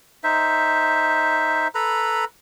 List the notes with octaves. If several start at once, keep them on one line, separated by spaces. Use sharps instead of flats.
D#4 C5 E5
A4 B4 A#5 B5